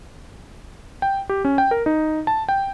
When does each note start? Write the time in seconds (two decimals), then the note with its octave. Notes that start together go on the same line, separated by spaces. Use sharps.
1.02 G5
1.29 G4
1.45 C#4
1.58 G5
1.71 A#4
1.86 D#4
2.27 A5
2.49 G5